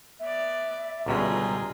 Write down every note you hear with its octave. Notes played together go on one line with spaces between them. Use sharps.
B3 D5 E5
C#2 G#2 B2 D3 G3 F4 G#4 A#5